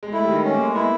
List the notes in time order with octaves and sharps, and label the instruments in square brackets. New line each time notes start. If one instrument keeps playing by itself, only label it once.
[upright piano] G#3
[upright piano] A3 [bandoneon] E4
[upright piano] G3
[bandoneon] D#3 [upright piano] G#3
[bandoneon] C#4
[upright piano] A#3
[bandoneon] G#3
[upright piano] B3 [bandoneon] E4